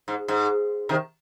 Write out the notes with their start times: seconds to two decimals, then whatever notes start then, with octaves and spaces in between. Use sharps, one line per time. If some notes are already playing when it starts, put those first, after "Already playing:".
0.08 G#2
0.28 G#2
0.89 C3 D#3